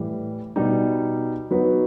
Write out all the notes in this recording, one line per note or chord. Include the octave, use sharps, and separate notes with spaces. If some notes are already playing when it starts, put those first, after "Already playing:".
Already playing: A2 E3 G3
B2 G3 D#4
F#3 B3 D#4 F#4 B4